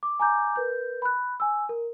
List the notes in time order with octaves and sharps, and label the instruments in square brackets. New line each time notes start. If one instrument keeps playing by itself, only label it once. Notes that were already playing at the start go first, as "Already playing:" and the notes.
[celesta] D6
G#5 A#5 D6 G6
A#4 B4 G6
B5 F#6
G#5 E6
A#4